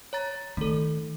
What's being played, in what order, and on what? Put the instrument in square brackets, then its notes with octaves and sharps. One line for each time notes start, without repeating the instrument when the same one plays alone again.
[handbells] C#5 A#5 A6
[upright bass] D#3 [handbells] A3 A4